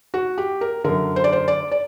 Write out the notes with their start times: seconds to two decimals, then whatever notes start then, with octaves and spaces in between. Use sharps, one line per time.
0.14 F#4
0.38 G4
0.61 A#4
0.84 F#2 D3 A#4
1.16 C5
1.24 D5
1.32 C5
1.48 D5
1.72 D5